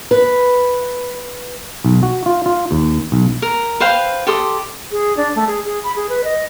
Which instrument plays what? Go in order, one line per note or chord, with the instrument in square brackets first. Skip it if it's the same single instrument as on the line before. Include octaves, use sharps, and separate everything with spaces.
[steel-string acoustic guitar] B4
[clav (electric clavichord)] B1
F#4
F4
F4
D#2
B1
[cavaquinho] A#4
B4 C5 F5 G5
G4 A4 C6 D#6
[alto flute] G#4
D4
A3
G#4
G#4
B5
G#4
B4
D#5